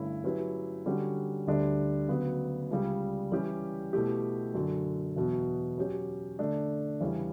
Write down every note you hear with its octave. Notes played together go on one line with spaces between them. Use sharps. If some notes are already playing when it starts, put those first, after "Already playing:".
Already playing: G2 D3 A3 C#4 E4
F#3 C#4 E4 G4 B4
D3 G3 C#4 F#4
D2 D3 G3 D4 G4
D2 C#3 F#3 B3
C#2 C#3 G3
E3 G3 C#4 G4
B2 A3 E4 G4
F#2 D3 F#3
E2 B2 F#3 B3
F#3 C#4 G4 C#5
D3 A3 D4
E2 C#3 G3 C#4 E4